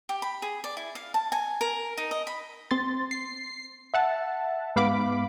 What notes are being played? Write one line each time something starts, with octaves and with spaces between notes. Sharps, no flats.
G4
B5
G#4
D5
E4
F5
A5
G#5
A#4
D#4
D#5
B5
C4 C6 A6
C7
E5 F#5 A5
G#2 B3 F5 B5 D6